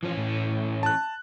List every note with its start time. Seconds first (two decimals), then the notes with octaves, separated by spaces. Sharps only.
0.03 E3 F3 C#4
0.17 A2
0.83 A5 F#6